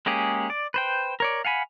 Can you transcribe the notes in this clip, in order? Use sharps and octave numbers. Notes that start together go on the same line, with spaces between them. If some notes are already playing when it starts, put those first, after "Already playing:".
G#3 A#3 C#4 G4 G#4
D5
B4 C5 G5
A#4 C#5 D5
F5 F#5 G#5 B5